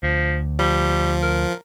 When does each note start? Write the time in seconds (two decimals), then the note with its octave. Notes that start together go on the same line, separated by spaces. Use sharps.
0.03 D2 F3
0.59 F3 G3
1.22 A#4